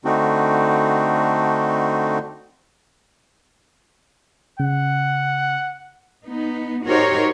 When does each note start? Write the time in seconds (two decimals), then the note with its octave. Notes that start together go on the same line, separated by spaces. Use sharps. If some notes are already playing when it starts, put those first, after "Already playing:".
0.05 D3 A3 C4 D4 D#4 F#4
4.60 C#3 F#5
6.25 B3 D#4
6.85 D#4 F#4 G4 A#4 C5 C#5